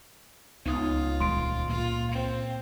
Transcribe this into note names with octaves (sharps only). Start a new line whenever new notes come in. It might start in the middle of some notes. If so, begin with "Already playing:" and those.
C#2 B3 D#4 F4 D#6
D#1 E2 G#3 C6 D7
A#2 F4
C4